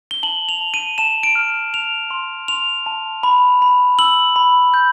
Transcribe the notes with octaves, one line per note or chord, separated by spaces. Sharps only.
G7
A5 F#7
F7
A5
D#7
A5 E7
D7
F6
A5 F7
C6
C6 F7
A5
B5
B5
E6 F#7
B5
G6